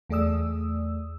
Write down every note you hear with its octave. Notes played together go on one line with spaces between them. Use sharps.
E2 A3 G#4 D5 D#6 E6